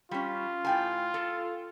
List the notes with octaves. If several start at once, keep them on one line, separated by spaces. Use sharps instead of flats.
G3 C#4 F4
A2 G5 G#5
A4